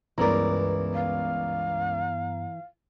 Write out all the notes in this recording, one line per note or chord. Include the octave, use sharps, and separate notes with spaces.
C#2 G2 E3 B3 A#4 D5 A#5
F5